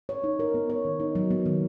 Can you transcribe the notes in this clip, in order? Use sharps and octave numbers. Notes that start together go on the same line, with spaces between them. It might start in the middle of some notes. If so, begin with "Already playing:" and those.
C#5
D#4
A#4
B3
C#5
D#3
D#4
F#3
B3
D#3